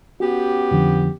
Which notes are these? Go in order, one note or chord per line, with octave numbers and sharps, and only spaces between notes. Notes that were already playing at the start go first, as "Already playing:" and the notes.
B3 C#4 F#4 G4
F2 D3 F3